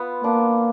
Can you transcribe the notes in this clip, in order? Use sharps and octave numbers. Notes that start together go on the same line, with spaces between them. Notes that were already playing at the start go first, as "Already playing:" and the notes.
Already playing: B3 F4
A#3 D4